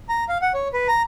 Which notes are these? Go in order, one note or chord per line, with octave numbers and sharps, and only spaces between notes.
A#5
F5
F#5
C#5
B4
A#5